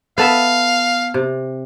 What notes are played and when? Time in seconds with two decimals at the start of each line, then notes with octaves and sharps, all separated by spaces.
0.18 B3 A4 E5 F5
1.14 C3